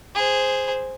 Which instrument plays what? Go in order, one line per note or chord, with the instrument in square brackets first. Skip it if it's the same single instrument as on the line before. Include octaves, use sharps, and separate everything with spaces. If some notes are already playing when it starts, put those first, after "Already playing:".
[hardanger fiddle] G#4 C5